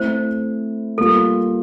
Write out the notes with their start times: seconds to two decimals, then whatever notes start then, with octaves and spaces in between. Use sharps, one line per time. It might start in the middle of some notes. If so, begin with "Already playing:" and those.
Already playing: A3 C4 E4 C5
0.98 G3 A#3 F4 A4